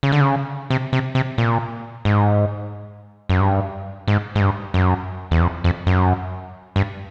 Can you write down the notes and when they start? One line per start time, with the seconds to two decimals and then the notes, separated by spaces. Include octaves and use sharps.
0.03 C#3
0.12 D3
0.21 C#3
0.70 C3
0.93 C3
1.15 C3
1.38 A#2
2.05 G#2
3.30 F#2
3.40 G2
4.08 G#2
4.35 G#2
4.40 G2
4.74 F#2
5.31 E2
5.41 F2
5.64 F2
5.87 F#2
6.76 G2